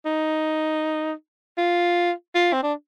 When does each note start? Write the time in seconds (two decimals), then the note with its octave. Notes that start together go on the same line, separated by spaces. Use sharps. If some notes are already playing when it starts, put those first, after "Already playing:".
0.06 D#4
1.58 F4
2.35 F4
2.53 C4
2.63 D4